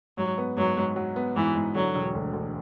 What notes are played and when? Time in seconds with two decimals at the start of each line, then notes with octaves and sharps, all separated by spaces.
0.17 G#2 F#3
0.38 B3
0.57 G#2 F#3
0.77 G#2
0.96 F#3
1.16 B3
1.36 G#2 E3
1.55 G#2
1.75 D3 F#3
1.95 E1
2.15 D2
2.33 D2